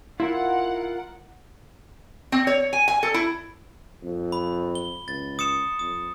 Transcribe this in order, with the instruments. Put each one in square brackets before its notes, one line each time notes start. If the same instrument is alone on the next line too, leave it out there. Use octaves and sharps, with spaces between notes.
[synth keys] E4 [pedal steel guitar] F4 A#4 [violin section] F#5
[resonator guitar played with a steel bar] C4
C#5
G#5
G#5
A4
E4
[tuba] F2
[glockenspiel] B5
G7
[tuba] C#2 [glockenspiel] A6
[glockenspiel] D#6 C#7 E7
[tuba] F2 [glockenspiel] D#6